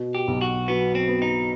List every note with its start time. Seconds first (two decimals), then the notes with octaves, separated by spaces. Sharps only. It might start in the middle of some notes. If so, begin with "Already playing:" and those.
Already playing: B2
0.15 G4
0.28 B1
0.41 F#4
0.68 F#3 B3
0.95 C4
1.08 B3
1.22 D#4